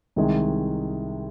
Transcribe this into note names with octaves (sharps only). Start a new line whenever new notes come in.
C2 C3 D#3 G#3